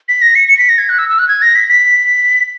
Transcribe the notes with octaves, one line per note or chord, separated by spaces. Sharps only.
B6
A#6
C#7
C#7
B6
A#6
G#6
F#6
E6
E6
F#6
G#6
A#6
B6
B6